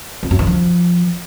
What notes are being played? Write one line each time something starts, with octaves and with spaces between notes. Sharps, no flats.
F2
F#2
D#3
F3